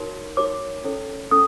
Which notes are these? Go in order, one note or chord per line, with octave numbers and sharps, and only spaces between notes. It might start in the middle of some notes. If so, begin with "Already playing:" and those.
Already playing: D#4 F#4 A#4 C#5
D#4 F#4 A#4 C#5 D6
C#4 E4 A4 C#5
C#4 E4 A4 D#6